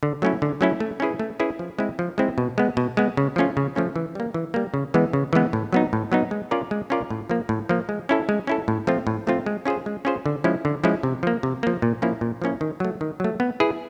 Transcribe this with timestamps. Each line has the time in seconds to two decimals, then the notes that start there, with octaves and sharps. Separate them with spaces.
0.03 D3
0.22 F#3 A3 C#4 E4
0.42 D3
0.61 F#3 A3 C#4 E4
0.80 A3
1.00 C#4 E4 G#4 B4
1.19 A3
1.40 C#4 E4 G#4 B4
1.59 F3
1.78 G#3 C4 E4
1.99 F3
2.18 G#3 C4 E4
2.38 B2
2.58 G#3 B3
2.77 B2
2.97 G#3 B3
3.17 C#3
3.36 F3 A3 C#4 F4
3.57 C#3
3.75 F3 A3 C#4 F4
3.96 E3
4.15 G3 A#3
4.34 E3
4.54 G3 A#3
4.74 C#3
4.94 E3 G#3 B3
5.13 C#3
5.33 E3 G#3 B3
5.53 A2
5.73 F#3 B3 D#4
5.93 A2
6.12 F#3 B3 D#4
6.31 G#3
6.51 C#4 F4 A#4 D5
6.71 G#3
6.90 C#4 F4 A#4 D5
7.10 A2
7.29 F3 A#3
7.49 A2
7.69 F3 A#3
7.89 G#3
8.09 C#4 E4 A4
8.29 G#3
8.47 C#4 E4 A4
8.68 A2
8.87 F3 A3 C4 F4
9.07 A2
9.27 F3 A3 C4 F4
9.46 G#3
9.65 C#4 F4 G#4 C5
9.86 G#3
10.05 C#4 F4 G#4 C5
10.26 D3
10.44 F3 G#3 C#4 E4
10.65 D3
10.84 F3 G#3 C#4 E4
11.03 C3
11.23 F3 A#3
11.43 C3
11.63 F3 A#3
11.82 A#2
12.02 F3 A#3 C#4 E4
12.21 A#2
12.42 F3 A#3 C#4 E4
12.61 D#3
12.80 F#3 A3
13.01 D#3
13.20 F#3 A3
13.40 B3
13.60 E4 G#4 B4